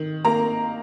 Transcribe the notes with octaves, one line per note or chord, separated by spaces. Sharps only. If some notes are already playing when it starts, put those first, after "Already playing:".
Already playing: D#3
A#3 A#5